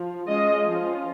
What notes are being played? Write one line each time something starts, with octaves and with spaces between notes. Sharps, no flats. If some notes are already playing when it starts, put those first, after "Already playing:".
Already playing: F3
G#3 C#4 F4 D#5
F3 C#4 F4